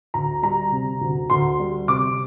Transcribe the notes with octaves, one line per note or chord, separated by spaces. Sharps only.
D2 A#5
G3 A#5
C3
D2
D2 C6
G3
C3 D6